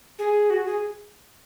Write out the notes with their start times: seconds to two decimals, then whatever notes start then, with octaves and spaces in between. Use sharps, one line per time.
0.19 G#4
0.50 F#4
0.65 G#4